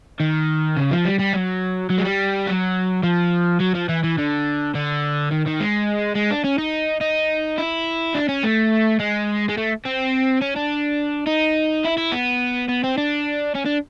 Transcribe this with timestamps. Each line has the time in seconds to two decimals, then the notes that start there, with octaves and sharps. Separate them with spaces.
0.20 D#3
0.77 C#3
0.91 F3
1.05 G3
1.19 G3
1.33 F#3
1.90 F#3
1.98 G#3
2.05 G3
2.47 F#3
3.03 F3
3.60 F#3
3.75 F3
3.89 E3
4.03 E3
4.18 D3
4.75 D3
5.31 D#3
5.46 D#3
5.60 G#3
6.16 G#3
6.31 D4
6.44 C#4
6.58 D#4
7.01 D#4
7.58 E4
8.14 D4
8.29 C#4
8.44 A3
9.00 G#3
9.49 G#3
9.58 A3
9.85 C4
10.42 C#4
10.56 D4
11.27 D#4
11.85 E4
11.98 E4
12.12 B3
12.69 B3
12.84 C4
12.98 D4
13.55 C#4
13.66 D4